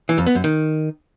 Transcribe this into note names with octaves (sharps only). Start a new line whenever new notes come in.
E3
F2
B3
F#2
D#3